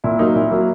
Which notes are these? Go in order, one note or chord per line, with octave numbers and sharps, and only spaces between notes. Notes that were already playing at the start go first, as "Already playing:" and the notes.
A#2 E4
F#3 A#3 D#4
A#2 E4
F#3 A#3